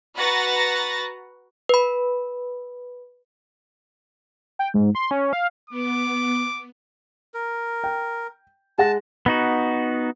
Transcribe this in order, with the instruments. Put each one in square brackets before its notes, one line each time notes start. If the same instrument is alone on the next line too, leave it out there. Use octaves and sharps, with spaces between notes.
[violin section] F#4 B4 F#5 A#5 A6 A#6
[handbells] B4 B5
[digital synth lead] G5
G#2
C6
C#4
F5
[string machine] B3 [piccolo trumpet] D6
[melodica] A#4
[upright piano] G5
[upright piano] G#3 F#5 A#6 [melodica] A5
[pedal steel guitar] B3 D#4 F#4